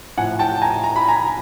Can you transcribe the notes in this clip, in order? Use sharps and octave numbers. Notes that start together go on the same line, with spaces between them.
A2 F3 F#5 G#5
G5 A5
G#5 A#5
A#5
B5
G#5 A#5